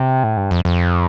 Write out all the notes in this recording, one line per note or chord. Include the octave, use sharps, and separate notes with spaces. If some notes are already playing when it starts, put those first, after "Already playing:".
Already playing: C3
A2
G2
F2
F2